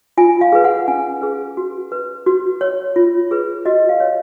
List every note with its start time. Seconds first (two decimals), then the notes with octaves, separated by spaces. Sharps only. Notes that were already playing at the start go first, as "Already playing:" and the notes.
0.17 F4 G#5
0.41 F5
0.52 G#4 B4
0.64 F#5
0.88 C#4 G#5
1.22 G#4 B4
1.57 F#4
1.92 B4
2.26 F#4
2.61 C#5
2.96 F4
3.31 G#4 B4
3.66 F#4 D#5
3.89 F5
4.00 C#5